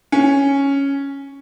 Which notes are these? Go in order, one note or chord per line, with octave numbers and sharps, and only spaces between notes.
C#4